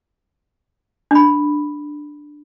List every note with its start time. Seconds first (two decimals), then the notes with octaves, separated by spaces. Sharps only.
1.11 D4 B5